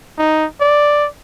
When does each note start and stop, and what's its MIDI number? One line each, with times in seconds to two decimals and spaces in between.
0.18 0.46 63
0.61 1.07 74